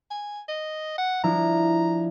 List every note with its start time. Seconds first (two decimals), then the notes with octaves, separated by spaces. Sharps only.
0.11 G#5
0.48 D#5
0.98 F#5
1.24 F3 D4 E4 A#5